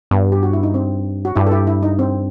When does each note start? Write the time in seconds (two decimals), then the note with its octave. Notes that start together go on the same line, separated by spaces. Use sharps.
0.11 G2 B3
0.32 G4
0.43 F#4
0.53 E4
0.63 D#4
0.74 C4
1.25 F#4
1.36 G2 E4 G4
1.47 A4
1.51 E4 G4
1.67 E4
1.83 D#4
1.99 C4